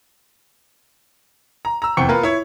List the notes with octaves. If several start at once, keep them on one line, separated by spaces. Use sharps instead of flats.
A#5
A#5 E6
F1 E2 C3 G5 C#6 C#7
A#3 F4 A#4 B4
E4 C#5